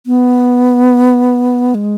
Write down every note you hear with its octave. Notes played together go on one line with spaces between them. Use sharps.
B3
G#3